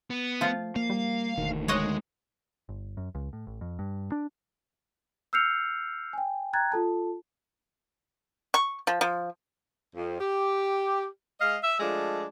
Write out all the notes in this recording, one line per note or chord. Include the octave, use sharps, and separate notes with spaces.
B3
F3 A3 F4
A#3 F5
G3
E1 D2 D#3
G#3 C#5 D#5 F#5
G1
F#2
C#2
A2
A1
F2
G2
D4
E6 F6 G6 C7 C#7 F7
G5 G#5
G5 A#5 F#6 G#6 A6
F4 A4 A5
C#6
F3
F3
F2
G4
G#3 D#5 F5
E5
F3 G#3 A3 D4